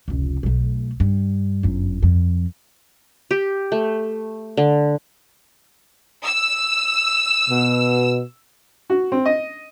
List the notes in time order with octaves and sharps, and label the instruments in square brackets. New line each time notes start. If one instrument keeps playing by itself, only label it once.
[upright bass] F1 C#2
B1 A3
G2
G1 F#2
F2
[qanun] G4
A3
D3
[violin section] E6
[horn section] B2
[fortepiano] F#4
C4
D#5